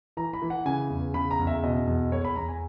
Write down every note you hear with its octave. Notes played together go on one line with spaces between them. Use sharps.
E3 A#5
B5
E3
F#5
C#3 G#5
E2
C#3 B5
A#5
E2
E5
B2 D#5
E2
E2 C#5
B5
E2 A#5
G#5